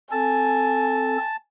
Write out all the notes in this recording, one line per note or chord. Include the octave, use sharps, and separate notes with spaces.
C4 A4 G#5 A5